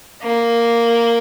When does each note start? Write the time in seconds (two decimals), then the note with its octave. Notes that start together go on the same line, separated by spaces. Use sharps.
0.22 A#3